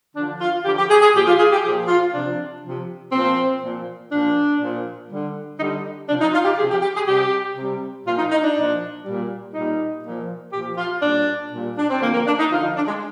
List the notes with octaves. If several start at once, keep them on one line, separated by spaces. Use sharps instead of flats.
D3 F3 D4
F4
D3 F3 G4
G4
G#4
G#4
A#2 F3 G4
F4
G#4
G4
A#2 F3 G#4
F4
C3 F3 D4
C3 F3
A#2 F3 C4
A#2 F3
A#2 F3 D4
A#2 F3
D3 G3
D3 G3 D#4
C3 F3 D4
D#4
F4
G4
C3 F3 G#4
G4
G4
G#4
C3 G3 G4
C3 G3
A#2 F3 F4
D#4
D#4
D4
A#2 F3
A#2 G3
A#2 G3 D#4
A#2 F3
A#2 F3 G4
F4
A#2 G3 D4
A#2 G3
D4
C4
D3 F3 A#3
A#3
D4
D#4
D3 F3 F4
D#4
D4
G#3